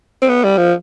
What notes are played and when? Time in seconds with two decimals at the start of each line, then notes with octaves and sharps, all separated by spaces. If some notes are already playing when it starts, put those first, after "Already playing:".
0.22 C4
0.29 B3
0.44 G3
0.57 F3